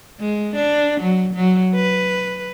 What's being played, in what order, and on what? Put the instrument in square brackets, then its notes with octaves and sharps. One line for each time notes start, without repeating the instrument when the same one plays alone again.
[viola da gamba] G#3
D4
F#3
F#3
B4